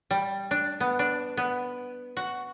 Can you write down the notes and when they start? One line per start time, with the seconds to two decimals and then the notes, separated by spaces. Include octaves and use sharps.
0.11 G3
0.51 D4
0.80 B3
0.99 D4
1.37 B3
2.17 F#4